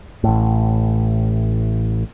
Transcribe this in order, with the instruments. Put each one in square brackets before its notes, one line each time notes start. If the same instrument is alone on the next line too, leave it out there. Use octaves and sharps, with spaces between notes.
[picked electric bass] A1 A2